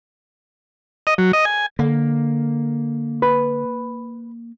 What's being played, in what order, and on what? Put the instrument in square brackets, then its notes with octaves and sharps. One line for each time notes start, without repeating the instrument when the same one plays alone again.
[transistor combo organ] D#5
F#3
D#5
G#5
[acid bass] D3 [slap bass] A#3
[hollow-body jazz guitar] B4